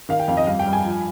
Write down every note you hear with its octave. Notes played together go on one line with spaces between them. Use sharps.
D#3 F5
G5
F2 F5
D#5
G2 F5
G5
G2
G#5
F3